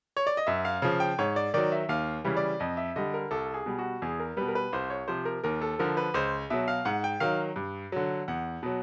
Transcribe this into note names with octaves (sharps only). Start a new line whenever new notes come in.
C#5
D5
D#5
F#2 E5
F5
C#3 F3
G5
G#2 C#5
D5
D#3 F#3 D5
E5
D#2 F5
C#3 E3 G3
D5
F2 D#5
E5
D3 G3 D#5
A#4
C2 A4
G#4
B2 G3
F#4
E2 G#4
A#4
B2 G3 B4
A#4
B4
C2 C5
C#5
C3 F3 C5
A#4
D#2 A#4
A4
D3 F3 A#4
B4
C#2 C5
B2 F#3 E5
F5
G#2 F#5
G5
D#3 F#3 F5
G2
D3 F#3
E2 F#5
B2 F#3